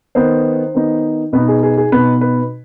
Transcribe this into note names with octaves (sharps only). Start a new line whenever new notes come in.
D#3 B3 D#4 C5
D#3 B3 D#4
B2 B3 D#4 B4
G#4
G#4
G#4
B2 B3 D#4 B4
B4